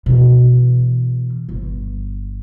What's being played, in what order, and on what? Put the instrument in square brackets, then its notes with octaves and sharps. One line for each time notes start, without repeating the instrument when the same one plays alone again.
[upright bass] B2 E3
G1